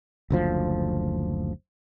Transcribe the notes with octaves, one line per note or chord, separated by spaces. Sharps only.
F#1 D2 F3